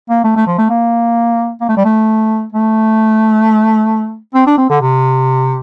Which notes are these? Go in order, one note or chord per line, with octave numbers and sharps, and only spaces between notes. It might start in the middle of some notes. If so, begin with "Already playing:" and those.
A#3
A3
A3
F3
A3
A#3
A#3
A3
G3
A3
A3
C4
D4
C4
D3
C3